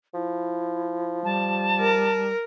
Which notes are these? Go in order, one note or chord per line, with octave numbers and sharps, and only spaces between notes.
F3 E4
G3 A5
A#4